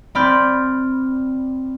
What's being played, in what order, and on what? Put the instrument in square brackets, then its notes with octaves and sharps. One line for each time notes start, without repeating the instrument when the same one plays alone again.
[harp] C4 D5 B5 F6 G6